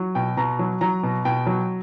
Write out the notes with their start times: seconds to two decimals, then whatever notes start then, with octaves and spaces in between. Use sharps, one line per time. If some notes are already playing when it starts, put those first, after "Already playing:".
Already playing: F#3
0.15 B2 G5
0.37 B2 A#5
0.59 F#3
0.81 F#3 A#5
1.03 B2
1.25 B2 G5
1.46 F#3